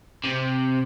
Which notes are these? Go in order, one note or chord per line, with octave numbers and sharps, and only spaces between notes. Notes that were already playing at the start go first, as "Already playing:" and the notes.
C3